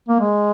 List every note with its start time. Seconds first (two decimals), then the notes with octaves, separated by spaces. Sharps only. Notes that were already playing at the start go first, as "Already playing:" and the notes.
0.09 A#3
0.20 G#3